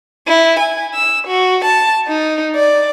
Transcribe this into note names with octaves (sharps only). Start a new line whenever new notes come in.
E4
G#5
E6
F#4
A5
D#4
D5